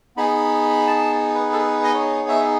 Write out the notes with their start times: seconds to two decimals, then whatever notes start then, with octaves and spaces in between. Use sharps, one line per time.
0.16 B3 D#4 G#4 B5
0.87 A5
1.34 B4
1.53 A4
1.58 B4
1.84 D#5
1.94 C#5
2.29 E5